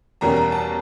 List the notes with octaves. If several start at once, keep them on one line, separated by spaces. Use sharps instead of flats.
E2 B2 G3 A#3 C#4 A#5
A#5
A5